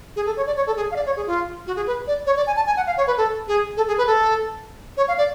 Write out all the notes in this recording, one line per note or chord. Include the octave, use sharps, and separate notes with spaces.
G#4
A4
C#5
D5
C#5
A4
G#4
F5
D5
C#5
G#4
F4
F#4
G#4
B4
D5
C#5
D5
G#5
A5
G#5
F#5
F5
C#5
B4
A4
G#4
A4
G#4
B4
A4
C#5
F5
D5